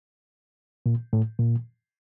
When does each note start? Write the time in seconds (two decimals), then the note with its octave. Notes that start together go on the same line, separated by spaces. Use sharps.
0.86 A#2
1.13 A2
1.39 A#2